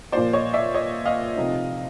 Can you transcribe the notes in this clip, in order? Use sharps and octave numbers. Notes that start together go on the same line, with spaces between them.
A#2 F3 A#3 C5 D5
C#5 D#5
D5 E5
C#5 D#5
D#5 F5
C3 F3 A3 C4 D#4